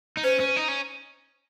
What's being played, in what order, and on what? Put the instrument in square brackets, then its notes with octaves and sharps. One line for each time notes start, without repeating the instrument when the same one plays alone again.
[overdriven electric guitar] D#4
[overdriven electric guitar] C#4 [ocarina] C5
[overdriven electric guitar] C#4
D#4
C#4